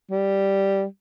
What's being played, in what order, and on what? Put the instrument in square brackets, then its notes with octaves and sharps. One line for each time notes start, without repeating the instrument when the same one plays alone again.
[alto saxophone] G3